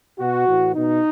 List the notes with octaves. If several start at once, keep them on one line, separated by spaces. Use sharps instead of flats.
B2 F#4
A2 E3
B2 D#4